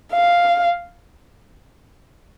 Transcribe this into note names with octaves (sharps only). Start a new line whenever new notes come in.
F5